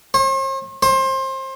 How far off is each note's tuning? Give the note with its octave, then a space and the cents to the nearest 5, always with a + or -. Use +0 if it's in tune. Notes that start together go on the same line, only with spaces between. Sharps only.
C5 +45
C5 +25